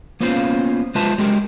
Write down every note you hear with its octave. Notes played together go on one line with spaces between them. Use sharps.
A#3 B3 C#4 F4 C5 F5
G#3 F4 B4 C5 E5 A5
F#3 G#3 G4 A4 A#4